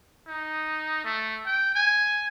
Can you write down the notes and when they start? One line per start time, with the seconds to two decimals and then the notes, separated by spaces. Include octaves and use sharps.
0.28 D#4
1.05 A3
1.46 G5
1.75 G#5